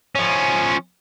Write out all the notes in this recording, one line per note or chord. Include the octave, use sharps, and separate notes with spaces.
F3 C#4